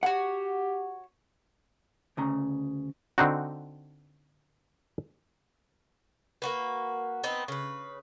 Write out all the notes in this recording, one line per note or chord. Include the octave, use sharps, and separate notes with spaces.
F#4 G4 C#5 F#5
D2 C#3 A#5
D3 C4 D4 D#4 F#4
A#3 F#4 B4
B3 C4 D#4 B4
C#3 B4